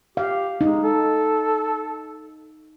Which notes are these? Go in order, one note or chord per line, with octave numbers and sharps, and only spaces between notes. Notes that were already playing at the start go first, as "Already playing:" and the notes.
G4 F5
G#3 D#4
A4